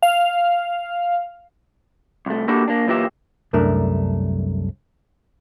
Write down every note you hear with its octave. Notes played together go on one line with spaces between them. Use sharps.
F5
C2 A3
A#3 D4 E4 F#4 G4 A4
A#3 D4
B1 A#2 E3 A#3 G4 E5
C2 F#2 A3 D4 A#4